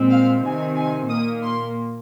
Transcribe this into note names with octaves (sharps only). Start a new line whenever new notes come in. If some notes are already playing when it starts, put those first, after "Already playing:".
Already playing: A#2 G#3 C4
F5
C3 D#3 C4 G#5
G#5
A#2 A#3 D#6
C6